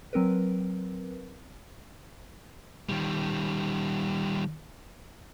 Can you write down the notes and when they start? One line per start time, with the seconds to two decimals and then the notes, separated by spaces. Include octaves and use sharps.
0.13 F#3 C4 A#4 B4
2.89 D#3 G3